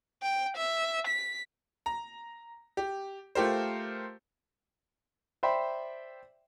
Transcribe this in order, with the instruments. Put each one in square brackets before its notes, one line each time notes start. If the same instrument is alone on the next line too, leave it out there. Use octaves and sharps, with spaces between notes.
[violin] G5
E5
B6
[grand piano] A#5
G4
A3 F4 G4 A#4 C5
[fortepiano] C5 D5 E5 G5 B5 C6